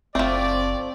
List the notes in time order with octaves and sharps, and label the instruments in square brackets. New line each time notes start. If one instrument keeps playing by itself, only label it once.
[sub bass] F#1 [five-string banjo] F3 A3 [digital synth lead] C4 [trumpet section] D5